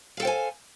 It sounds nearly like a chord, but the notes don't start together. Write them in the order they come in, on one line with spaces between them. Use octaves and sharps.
F5 A4 G5 C5 G#5